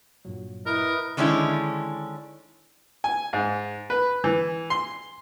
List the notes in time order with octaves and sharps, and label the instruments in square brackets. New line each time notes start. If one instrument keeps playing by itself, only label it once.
[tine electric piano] G2 A#2 F#3
[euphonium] E4 [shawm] A#4 [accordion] B4 D#5
[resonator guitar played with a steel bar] D3 D#3 G#3 C#4 D4 E4
[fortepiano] G#5
G#2
B4
E3
C6